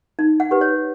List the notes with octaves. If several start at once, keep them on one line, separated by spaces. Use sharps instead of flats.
D#4
F#5
G4 B4
C#5